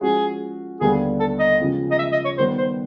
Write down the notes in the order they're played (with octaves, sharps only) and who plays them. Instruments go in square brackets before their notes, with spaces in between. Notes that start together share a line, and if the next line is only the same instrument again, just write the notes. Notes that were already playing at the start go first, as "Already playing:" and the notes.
[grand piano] F3 G#3 C#4 F#4 [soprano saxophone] G#4
[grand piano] D#2 D3 G3 B3 [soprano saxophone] G#4
[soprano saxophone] A4
D#5
[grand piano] C#3 F3 G#3 C#4 F4
[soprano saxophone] D#5
E5
D#5
C#5
[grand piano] D#3 G3 B3 [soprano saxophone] C5
[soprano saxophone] C5